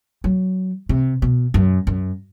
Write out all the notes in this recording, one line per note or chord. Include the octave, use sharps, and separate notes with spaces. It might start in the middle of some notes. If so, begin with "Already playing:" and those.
F#3
C3
B2
F#2
F#2